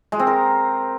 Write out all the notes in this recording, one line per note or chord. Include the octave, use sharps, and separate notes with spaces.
G#3
C4
A#4